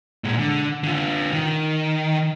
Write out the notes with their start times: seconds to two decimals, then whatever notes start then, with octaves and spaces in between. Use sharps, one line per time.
0.24 A#2 G#3
0.39 D3
0.84 D3 F4
1.33 D#3